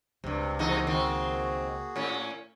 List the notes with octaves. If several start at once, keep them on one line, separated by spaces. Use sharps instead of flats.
C#2 G2 C3
E2 C3 A#3 D#4 F#4 G#4
D#3 C4
A2 C#4